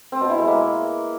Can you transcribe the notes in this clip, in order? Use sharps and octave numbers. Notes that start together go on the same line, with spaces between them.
C4
B2
E4
G#3
A#3